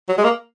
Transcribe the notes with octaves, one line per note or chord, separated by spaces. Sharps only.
F#3
G#3
A#3